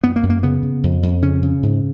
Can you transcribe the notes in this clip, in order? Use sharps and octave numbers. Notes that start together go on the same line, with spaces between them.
F#2 B3
A#3
F#2
A#3
C#3 B3
C#3
F2
F2
C#3 C#4
C#3
G#2